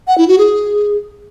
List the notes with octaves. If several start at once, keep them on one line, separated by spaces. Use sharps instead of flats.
F#5
E4
F#4
G#4